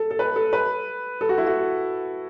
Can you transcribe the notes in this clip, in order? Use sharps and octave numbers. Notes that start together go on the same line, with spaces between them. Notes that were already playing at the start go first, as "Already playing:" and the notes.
Already playing: A4
A4
B4
A4
B4
A4
F#4
E4
F#4